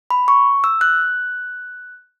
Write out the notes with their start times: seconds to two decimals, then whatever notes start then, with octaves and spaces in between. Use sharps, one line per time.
0.11 B5
0.28 C#6
0.64 E6
0.81 F#6